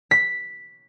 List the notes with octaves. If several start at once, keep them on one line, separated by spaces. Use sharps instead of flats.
B6